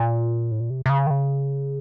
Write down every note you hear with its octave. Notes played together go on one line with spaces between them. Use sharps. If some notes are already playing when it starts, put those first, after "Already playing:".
Already playing: A#2
A2
A#2
C3
C3
C#3
D#3
C#3